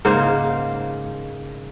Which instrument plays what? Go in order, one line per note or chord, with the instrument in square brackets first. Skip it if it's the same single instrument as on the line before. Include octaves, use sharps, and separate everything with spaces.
[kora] G#2 C#3 A#3 C5